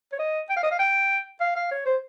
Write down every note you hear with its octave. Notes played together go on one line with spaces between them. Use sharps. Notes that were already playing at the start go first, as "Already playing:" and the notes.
C#5
D#5
G5
F5
D#5
F5
G5
F5
F5
C#5
C5